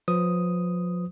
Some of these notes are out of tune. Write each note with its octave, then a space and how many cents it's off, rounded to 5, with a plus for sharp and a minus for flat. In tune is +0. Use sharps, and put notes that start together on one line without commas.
F3 +35 B4 +35 D#6 +0